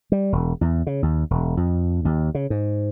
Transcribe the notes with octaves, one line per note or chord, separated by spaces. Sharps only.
G3
E1
E2
C#3
D#2
E1
F2
D#2
C#3
G#2